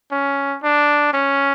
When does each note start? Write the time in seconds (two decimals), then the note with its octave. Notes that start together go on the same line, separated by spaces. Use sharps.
0.12 C#4
0.63 D4
1.14 C#4